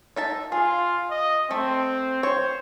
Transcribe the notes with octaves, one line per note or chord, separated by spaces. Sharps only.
D#4 E5 A5
F4 G#4
D#5
A3 C4
C5 C#5